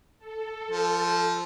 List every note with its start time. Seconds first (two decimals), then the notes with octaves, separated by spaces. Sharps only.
0.19 A4
0.70 F3